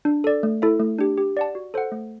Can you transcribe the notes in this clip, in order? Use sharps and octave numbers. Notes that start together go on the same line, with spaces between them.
D4
A4 D5
A3
E4 A4 E5
A3
D4 G4
G4
D5 F#5 A5
F#4
A4 C5 F#5
A3